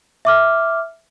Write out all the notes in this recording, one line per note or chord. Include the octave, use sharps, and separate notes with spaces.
E5 D6 F6